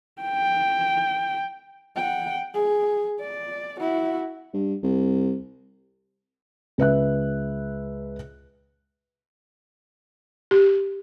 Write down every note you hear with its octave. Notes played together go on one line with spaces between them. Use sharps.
G5
F#5 G5
G#4
D5
E4 F#4
G2
C2
C#2 B4 E5 F#6
G4